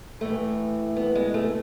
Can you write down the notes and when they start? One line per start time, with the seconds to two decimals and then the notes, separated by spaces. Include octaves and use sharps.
0.21 A2 E3 A3
0.96 B3
1.15 G#3
1.34 A3